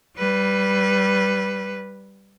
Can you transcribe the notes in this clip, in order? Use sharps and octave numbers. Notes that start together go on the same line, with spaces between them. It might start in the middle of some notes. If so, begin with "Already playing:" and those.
G3 B4